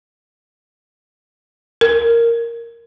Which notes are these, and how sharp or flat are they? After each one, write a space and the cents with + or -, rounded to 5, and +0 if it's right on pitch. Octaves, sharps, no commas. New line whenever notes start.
A#4 -5